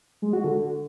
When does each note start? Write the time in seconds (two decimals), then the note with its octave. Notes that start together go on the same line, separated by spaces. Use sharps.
0.22 G#3
0.33 F#4
0.44 D3